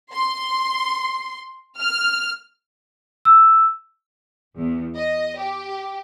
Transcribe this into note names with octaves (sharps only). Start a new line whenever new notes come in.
C6
F6
E6
E2
D#5
G4